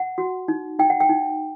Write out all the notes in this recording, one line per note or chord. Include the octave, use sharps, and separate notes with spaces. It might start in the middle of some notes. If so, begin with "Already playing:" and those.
Already playing: F#5
F#4
D#4
D#4 G5
F#5
G5
D#4